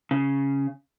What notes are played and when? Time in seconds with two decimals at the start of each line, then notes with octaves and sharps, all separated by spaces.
0.11 C#3